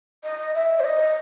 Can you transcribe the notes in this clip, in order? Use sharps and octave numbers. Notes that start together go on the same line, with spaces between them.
D#5
E5
C5
D#5